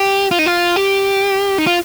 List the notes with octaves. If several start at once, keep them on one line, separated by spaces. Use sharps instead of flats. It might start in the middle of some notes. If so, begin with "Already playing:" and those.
Already playing: G4
F4
D#4
F4
G4
D#4
F4